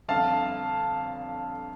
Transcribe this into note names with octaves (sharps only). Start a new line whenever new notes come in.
G1 F2 D3 F5 A5